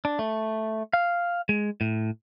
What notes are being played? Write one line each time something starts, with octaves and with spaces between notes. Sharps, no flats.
D4
A3
F5
G#3
A2